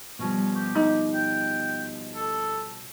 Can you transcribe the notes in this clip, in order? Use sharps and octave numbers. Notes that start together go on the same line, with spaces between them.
B2 F3 G3 C#4
G4
D#4
G5
A4